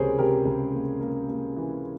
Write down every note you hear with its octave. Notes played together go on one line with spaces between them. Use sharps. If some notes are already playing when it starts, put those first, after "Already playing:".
Already playing: C#2 C3 G#4 A#4 C5 C#5
C3 G4 A#4
C#2
A#3
A#3
A#3
E3